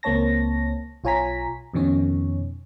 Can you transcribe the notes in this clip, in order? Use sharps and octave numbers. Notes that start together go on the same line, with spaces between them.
C#2 A#3 C4 C#5 A5 A#6
B1 F4 C#5 G#5 A#5 B6
F2 B2 D#3 C#4 C#5